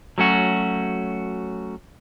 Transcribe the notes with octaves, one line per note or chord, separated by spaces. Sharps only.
F#3 A3 C#4 F#4